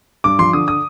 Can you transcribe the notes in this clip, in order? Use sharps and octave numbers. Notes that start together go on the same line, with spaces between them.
G2 D6
F3 C6
D3 D#6
D#6